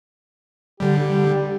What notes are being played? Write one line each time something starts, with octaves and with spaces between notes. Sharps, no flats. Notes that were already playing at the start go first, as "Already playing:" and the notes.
D3 G3 G4